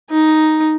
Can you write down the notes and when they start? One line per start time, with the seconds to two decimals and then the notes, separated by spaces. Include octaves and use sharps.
0.10 D#4